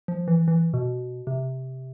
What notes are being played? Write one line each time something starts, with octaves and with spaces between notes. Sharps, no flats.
F3
E3
E3
B2
C3